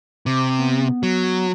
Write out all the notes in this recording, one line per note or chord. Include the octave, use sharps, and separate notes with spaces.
C3 D6
B3
F#3